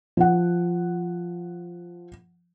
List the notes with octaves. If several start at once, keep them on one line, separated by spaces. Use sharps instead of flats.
F3 F#5